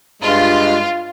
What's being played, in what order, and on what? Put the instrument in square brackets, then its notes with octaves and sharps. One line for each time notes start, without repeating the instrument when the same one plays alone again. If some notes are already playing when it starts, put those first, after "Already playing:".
[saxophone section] G2 G#3 [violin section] F4